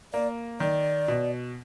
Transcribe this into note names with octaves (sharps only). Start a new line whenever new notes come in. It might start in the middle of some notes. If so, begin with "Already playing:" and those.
A#3 D5
D#3 D5
B2